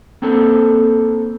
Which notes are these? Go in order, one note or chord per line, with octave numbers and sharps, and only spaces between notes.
A#3 C4 D4 A4 C5